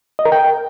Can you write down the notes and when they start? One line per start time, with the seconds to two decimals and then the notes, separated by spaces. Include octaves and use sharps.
0.19 D#5
0.25 A#4
0.32 G5